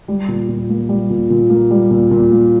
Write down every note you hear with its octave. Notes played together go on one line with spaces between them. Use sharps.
G3
A#2
A#2
A#3
G3
A#2
A#2
A#3
G3
A#2
A#2
A#3